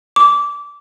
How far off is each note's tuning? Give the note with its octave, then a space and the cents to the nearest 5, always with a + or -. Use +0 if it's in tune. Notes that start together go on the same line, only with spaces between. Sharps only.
D6 -20